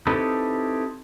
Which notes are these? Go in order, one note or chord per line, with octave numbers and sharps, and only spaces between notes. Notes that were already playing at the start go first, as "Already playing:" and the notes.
C4 D#4 E4 G4 A4 B4